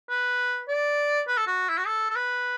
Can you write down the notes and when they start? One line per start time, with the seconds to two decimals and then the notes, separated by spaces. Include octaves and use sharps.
0.10 B4
0.68 D5
1.28 B4
1.37 A4
1.47 F#4
1.69 E4
1.78 F#4
1.86 A4
2.10 A4
2.16 B4